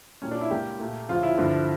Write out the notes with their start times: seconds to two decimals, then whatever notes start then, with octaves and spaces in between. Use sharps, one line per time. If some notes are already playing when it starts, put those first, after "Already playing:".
0.22 A#2 G3 A#3 C#4
0.31 D4
0.41 E4
0.50 C#2 C#3 G3 A#3 G4
0.79 A#2 A3
1.09 D2 C#3 F3 F4
1.23 E4
1.37 G2 D3 F3